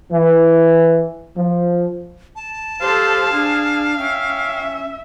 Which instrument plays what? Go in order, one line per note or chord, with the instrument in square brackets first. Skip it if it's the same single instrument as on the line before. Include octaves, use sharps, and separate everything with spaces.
[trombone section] E3
F3
[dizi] A5
[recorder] G4 [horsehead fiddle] A4 C5 [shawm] F5
[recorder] D4 [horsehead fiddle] G#4
[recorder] C#4 [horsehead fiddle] E5 [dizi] G5